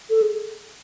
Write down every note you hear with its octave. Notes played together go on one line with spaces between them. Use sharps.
A4
G#4